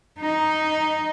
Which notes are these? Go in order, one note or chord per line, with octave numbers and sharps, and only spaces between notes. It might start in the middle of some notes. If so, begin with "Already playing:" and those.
D#4